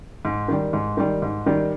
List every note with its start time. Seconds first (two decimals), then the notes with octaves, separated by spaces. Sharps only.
0.25 G#2
0.48 D#3 G3
0.73 G#2
0.97 D#3 G3
1.22 G#2
1.46 D#3 G3